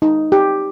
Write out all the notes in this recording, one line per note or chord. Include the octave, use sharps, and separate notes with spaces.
D#4
G4